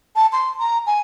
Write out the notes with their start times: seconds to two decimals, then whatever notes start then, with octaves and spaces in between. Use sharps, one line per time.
0.16 A5
0.33 C6
0.60 A#5
0.86 G#5